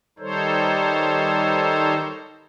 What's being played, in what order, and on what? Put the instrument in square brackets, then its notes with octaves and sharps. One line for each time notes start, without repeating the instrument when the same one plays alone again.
[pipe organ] D#3 G3 D#4 A4 C5 C#5